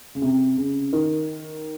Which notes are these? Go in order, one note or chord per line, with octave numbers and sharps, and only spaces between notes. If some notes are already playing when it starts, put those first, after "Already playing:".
C#3
C3
C#3
D#3